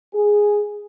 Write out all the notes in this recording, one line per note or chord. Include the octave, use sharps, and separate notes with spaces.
G#4